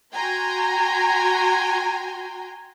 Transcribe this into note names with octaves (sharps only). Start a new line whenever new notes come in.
F#4 G5 G#5 A#5 C6